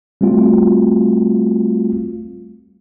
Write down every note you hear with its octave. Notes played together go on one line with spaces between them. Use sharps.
G3 A3 C4 F4 F#4